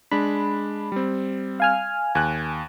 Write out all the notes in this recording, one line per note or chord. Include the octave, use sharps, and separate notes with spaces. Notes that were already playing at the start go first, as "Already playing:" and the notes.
G#3 D4 B5
G3 C4
F5 G#5 F6
D#2 G#5 F#6